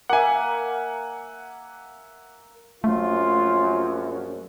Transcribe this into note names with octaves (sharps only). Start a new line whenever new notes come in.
A#3 E5 F#5 G#5
A#1 F#2 A3 F4